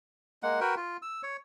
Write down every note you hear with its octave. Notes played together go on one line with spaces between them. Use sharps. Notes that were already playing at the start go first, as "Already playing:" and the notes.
G#3 A#3 F#5
F#4 A#4 B4 G5
F4
E6
C#5